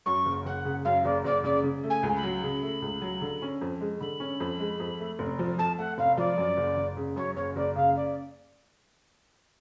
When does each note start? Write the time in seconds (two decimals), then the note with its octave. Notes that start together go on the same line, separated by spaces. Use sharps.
0.05 F#2 C#6
0.26 F#1
0.46 F#1 F#5
0.65 C#3
0.84 F#2 F5
1.04 F#1 D5
1.24 F#1 D5
1.44 C#3 D5
1.63 C#3
1.84 A3
1.90 G#5
2.03 C#2
2.16 B5
2.23 F#3
2.43 C#3
2.62 A3
2.82 C#2
3.02 F#3
3.22 D3
3.42 C#4
3.61 F2
3.81 G#3
4.00 D3 B5
4.20 C#4
4.40 F2
4.60 G#3
4.80 F2
5.00 A3
5.19 F1
5.39 F3
5.58 F2 A5
5.78 A3 F#5
5.98 F1 F5
6.17 F3 D5
6.37 F#2
6.57 F#1
6.77 F#1
6.97 C#3
7.16 F#2 C#5
7.36 F#1 C#5
7.56 F#1 D5
7.75 C#3 F5
7.96 D5